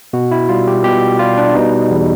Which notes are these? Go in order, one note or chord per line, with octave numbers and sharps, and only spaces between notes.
B2 F#4
E4
G3 F4
G4
B2 G4
G3 F4
D4
B2 D#4
E2